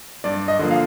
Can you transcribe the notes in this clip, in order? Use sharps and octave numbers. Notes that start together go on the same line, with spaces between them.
G2 D5
D#5
D3 F3 A#3
F5